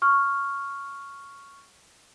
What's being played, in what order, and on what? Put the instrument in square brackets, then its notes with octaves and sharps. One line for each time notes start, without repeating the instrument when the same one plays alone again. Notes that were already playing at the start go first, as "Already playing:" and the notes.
[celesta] C#6 F6